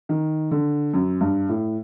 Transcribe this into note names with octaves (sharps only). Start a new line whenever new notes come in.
D#3
D3
F#2
G2
A2